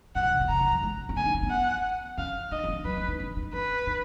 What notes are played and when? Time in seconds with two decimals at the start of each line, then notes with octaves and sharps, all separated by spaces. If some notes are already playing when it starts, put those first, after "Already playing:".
0.15 G#2 F#5
0.24 A#2
0.32 C#3
0.41 B2
0.49 C#3 A#5
0.60 D#3
0.72 F3
0.83 G#3
1.09 C#4
1.16 B3 G#5
1.25 D#4
1.33 C#4
1.43 B3
1.51 F#5
2.18 C#4 F5
2.51 D#4 D#5
2.64 D#4
2.69 C#4
2.85 F#3 B4
2.97 C#4
3.08 D#4
3.20 C#4
3.37 D#4
3.53 C#4 B4
3.87 D#4